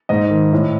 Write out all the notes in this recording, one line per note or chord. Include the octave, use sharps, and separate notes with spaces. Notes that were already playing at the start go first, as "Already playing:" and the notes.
G#2 D#5
D#3
A2